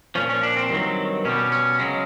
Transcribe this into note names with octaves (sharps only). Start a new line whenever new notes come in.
A#2 F3 C#4
C#4
D4
C4
G2 D#3 F#3
B2 G3 C#4
C#4
C#3 F#3 G#3